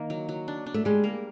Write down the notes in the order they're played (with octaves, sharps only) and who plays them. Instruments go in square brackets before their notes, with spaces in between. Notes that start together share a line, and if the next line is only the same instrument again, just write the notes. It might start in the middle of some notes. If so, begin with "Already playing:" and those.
Already playing: [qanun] D#3 A#3
F#3
F#3
D4
D4
[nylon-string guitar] A3
[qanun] G3 [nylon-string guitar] G#3
[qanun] A#3